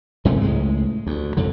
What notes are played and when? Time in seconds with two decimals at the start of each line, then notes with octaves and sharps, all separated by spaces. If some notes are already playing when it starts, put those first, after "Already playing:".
0.25 G2 C3 G#3 A3
0.42 C#2 A2 G#3
1.07 D2
1.37 F2 G#2 D3